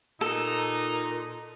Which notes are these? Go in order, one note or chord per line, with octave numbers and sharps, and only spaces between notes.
A#2 D#4 A4